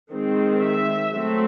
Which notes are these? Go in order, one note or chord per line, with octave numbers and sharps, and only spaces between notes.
D#3 G#3 C4
E5
F#3 A3 C4